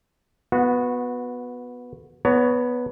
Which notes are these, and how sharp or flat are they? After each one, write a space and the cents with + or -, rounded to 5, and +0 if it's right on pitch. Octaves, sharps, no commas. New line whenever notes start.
B3 +0 F#4 -20
B3 +0 C#5 +25 A#5 -40